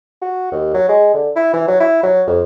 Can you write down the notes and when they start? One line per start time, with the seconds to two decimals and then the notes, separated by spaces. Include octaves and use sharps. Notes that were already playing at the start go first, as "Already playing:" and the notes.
0.22 F#4
0.52 D#2
0.74 F#3
0.89 G#3
1.14 D3
1.36 E4
1.53 E3
1.68 F#3
1.80 E4
2.03 F#3
2.27 F2